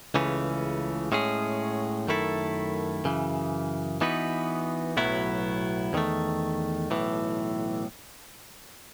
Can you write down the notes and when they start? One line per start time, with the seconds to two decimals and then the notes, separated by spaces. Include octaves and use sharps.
0.14 C#2 C#3 E3 A3 C#4
1.12 A2 G#3 C#4 G#4
2.07 F#2 D#3 A3 E4 A4
3.05 F#2 C#3 E3
4.01 E3 B3 D#4 F#4 B4
4.97 B1 A2 F#3 B3 E4
5.93 E2 D#3 A3
6.90 B1 A2 E3